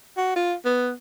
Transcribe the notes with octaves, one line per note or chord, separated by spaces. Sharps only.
F#4
F4
B3